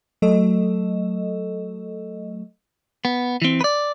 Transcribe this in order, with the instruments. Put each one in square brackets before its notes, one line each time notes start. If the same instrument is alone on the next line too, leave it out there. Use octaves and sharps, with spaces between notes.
[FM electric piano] F#3 A3 A4 D#5
[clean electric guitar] B3
E3 C4
B4 D5